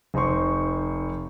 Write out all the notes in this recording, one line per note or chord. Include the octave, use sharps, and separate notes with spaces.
F1 D#4 C5 C6 C#6